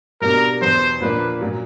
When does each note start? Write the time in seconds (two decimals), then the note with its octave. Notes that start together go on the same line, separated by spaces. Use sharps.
0.21 B2 G3 A#3 D4 A#4
0.62 E2 B2 F#3 B3 C5
1.01 A#2 F3 A#3 D4 B4
1.41 A#2 F#3